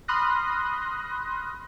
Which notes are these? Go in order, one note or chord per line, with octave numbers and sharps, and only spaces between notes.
B5 C6 D#6 F6 F#6 A#6